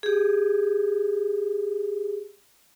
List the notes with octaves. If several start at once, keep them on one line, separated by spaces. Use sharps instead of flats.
G4 G#4